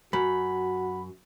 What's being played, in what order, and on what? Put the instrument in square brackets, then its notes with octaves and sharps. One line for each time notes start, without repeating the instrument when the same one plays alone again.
[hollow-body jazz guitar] F#2 [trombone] F#4 [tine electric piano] B5